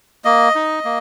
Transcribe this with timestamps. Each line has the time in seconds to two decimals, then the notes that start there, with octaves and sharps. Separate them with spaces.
0.25 A#3 D#5
0.55 D#4
0.85 A#3